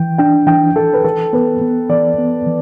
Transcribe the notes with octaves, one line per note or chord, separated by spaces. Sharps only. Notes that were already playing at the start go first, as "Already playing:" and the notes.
Already playing: E3 G5
D4 G5
E3 G5
E3 A4
B4
E3 A4
B3 B4
B3
E3 D5
B3
E3